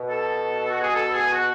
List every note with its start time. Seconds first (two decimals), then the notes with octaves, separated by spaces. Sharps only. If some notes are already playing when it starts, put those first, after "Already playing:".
Already playing: B2
0.10 A4
0.69 F#4
0.81 G#4
0.94 A4
1.13 G#4
1.32 F#4